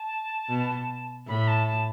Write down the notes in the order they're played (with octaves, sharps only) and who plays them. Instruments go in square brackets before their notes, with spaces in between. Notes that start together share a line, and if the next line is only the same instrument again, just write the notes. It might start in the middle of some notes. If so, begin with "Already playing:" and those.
Already playing: [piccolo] A5
[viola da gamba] B2
[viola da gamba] A2 [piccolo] B5
[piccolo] A5
A5